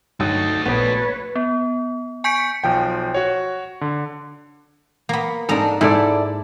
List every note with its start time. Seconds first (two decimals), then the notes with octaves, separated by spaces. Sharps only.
0.20 G2 F#3 A3 D#4 F#4 A5
0.66 A#1 B3 B4 C#5 A5
1.35 B3
2.24 G#5 C#6 G6 B6 C#7 D7
2.64 B1 F3 G5
3.14 F#4 C#5
3.81 D3
5.09 A#3 B3
5.49 G#2 D4 A4 D#5 A#5
5.81 G#2 E4 A4 D5